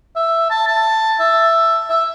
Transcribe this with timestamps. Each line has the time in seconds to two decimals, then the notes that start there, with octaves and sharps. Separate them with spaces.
0.16 E5
0.51 A5
0.67 A5
1.20 E5
1.90 E5